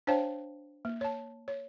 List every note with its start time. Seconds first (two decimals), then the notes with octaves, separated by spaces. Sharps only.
0.07 D4 C5 C#5 F5 G5 A5
0.85 A#3
1.01 C#5 A5
1.48 C#5